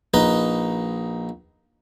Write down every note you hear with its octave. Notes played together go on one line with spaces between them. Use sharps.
A#1 D#4 B4 D#5